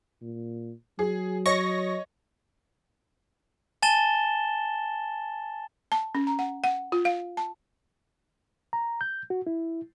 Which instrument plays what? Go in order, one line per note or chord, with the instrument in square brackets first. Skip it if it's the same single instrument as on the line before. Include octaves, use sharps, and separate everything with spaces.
[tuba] A#2
[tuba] F#3 [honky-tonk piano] G#4
[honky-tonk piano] C#5 D#5 [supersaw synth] C#6 A#6
[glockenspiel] G#5 A5 A6 E7 G7
[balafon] A5
C#4
A#5
F#5
F#5
F4
F5
A5
[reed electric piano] A#5
G6
F#4
E4